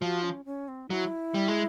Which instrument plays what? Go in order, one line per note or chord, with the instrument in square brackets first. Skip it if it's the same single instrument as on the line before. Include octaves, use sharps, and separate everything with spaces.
[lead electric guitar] F3 [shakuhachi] F#4
[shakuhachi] C#4
C#4
C4
[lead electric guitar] F#3 [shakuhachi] E4
[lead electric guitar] G3
G#3